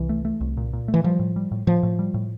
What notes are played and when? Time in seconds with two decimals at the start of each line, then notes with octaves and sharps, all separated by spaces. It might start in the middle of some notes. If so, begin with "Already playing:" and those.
Already playing: C2 E3
0.09 A3
0.25 A3
0.41 C2
0.57 A#2
0.73 A#2
0.88 A3
0.94 E3
1.04 F3 G3
1.19 A2
1.36 G3
1.52 A2
1.67 A2 F3
1.83 A2
1.99 G3
2.14 A2